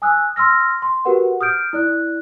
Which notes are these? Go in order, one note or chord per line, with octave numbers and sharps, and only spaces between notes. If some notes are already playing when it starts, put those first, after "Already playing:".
G#5 D#6 E6 F#6
C6 E6 F6 A#6
C6
F#4 G4 A#4 B4 F#5
D#6 F6 G6 D7
E4 D5 F#6